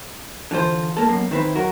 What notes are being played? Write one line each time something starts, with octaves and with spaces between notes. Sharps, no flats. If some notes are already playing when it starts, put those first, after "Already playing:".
D3 E3 F4 C5
A#3 A4
F#2 B2 A#3
D#3 C4 E4 B4
F#3 F#4 A#4